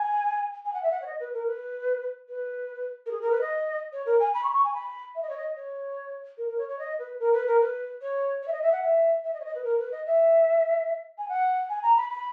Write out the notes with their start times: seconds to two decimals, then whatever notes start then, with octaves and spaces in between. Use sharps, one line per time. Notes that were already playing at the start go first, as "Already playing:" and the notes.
Already playing: G#5
0.65 G#5
0.73 F#5
0.83 E5
0.91 F#5
1.02 C#5
1.06 D#5
1.20 B4
1.34 A#4
1.47 B4
2.29 B4
3.06 A#4
3.11 G#4
3.21 A#4
3.31 B4
3.41 D#5
3.93 C#5
4.06 A#4
4.20 G#5
4.34 B5
4.43 C#6
4.50 B5
4.54 C#6
4.64 G#5
4.74 B5
5.15 E5
5.22 D#5
5.29 C#5
5.37 D#5
5.56 C#5
6.37 A#4
6.48 A#4
6.58 C#5
6.68 C#5
6.79 D#5
6.99 B4
7.20 A#4
7.33 B4
7.47 A#4
7.61 B4
8.02 C#5
8.42 C#5
8.48 E5
8.52 D#5
8.62 E5
8.72 F#5
8.83 E5
9.24 E5
9.34 D#5
9.40 C#5
9.45 D#5
9.55 B4
9.64 A#4
9.79 B4
9.92 D#5
10.06 E5
11.18 G#5
11.28 F#5
11.69 G#5
11.83 A#5
11.96 B5
12.10 B5